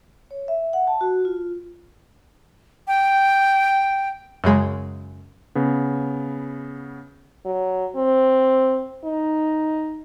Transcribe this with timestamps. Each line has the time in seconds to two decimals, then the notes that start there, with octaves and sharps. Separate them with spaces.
0.31 C#5
0.48 E5
0.73 F#5
0.87 A5
1.01 F#4
1.25 F4
2.88 G5
4.44 F#2 C#3 G#3
5.55 C#3 B3
7.45 F#3
7.96 C4
9.05 D#4